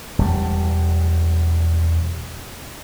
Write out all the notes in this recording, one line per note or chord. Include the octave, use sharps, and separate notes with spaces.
E1 G3